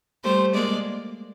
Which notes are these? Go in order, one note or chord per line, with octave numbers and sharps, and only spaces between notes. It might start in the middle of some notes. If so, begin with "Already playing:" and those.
G3 A3 C5
G#3 A#3 D5